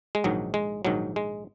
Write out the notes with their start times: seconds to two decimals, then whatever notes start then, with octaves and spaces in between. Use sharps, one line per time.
0.15 G#3
0.24 A#1 G#2 D#3 F#3
0.54 G#3
0.85 A#1 G#2 D#3 F#3
1.16 G#3